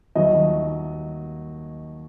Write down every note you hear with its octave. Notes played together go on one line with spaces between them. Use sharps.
D#2 D#3 F#3 D#5